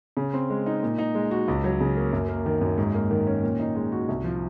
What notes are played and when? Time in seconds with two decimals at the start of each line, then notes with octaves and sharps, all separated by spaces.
0.17 C#3
0.33 C4
0.50 G#3
0.66 D#4
0.83 A#2
0.98 D#4
1.15 G#3
1.31 F#4
1.48 C#2
1.64 F#3
1.81 C#3
1.97 A#3
2.13 F#2
2.28 A#3
2.46 D#3
2.61 F#2
2.78 G#2
2.95 A#3
3.11 D#3
3.27 C#4
3.43 A#2
3.60 D#4
3.76 G#3
3.92 F#4
4.08 C2
4.24 F3